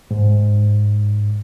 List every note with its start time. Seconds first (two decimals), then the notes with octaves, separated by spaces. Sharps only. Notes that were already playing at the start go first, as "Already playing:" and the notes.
0.11 G#2